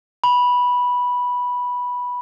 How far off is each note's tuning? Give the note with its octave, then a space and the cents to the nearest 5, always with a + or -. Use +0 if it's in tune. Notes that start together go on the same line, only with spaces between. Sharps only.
B5 -10